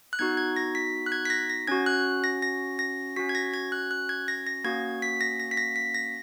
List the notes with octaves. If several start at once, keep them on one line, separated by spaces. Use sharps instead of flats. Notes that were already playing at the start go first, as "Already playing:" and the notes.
F#6
B3 D#4 F#4 G#6
G#6
A#6
B6
F#6
G#6
B6
A#6
A#6
C#4 F#4 G#6
F#6
A#6
A#6
A#6
C#4 F#4 B6
G#6
A#6
G#6
F#6
F#6
G#6
A#6
A#6
A#3 C#4 F#4 G#6
B6
A#6
A#6
B6
A#6
B6
A#6